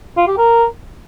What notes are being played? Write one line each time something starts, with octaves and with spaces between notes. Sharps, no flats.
F4
G4
A#4